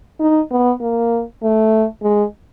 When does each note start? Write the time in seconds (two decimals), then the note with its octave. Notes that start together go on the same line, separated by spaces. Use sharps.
0.20 D#4
0.51 B3
0.80 A#3
1.42 A3
2.02 G#3